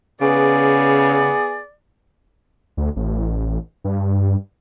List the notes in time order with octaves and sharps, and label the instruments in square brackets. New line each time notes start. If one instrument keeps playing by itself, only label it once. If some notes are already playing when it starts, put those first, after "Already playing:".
[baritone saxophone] C#3 [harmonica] B3 G#4 B4 [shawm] D5
[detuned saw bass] D2
A1
G2